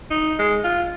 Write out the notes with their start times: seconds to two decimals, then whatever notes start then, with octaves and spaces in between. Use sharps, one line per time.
0.10 D#4
0.39 G#3
0.64 F4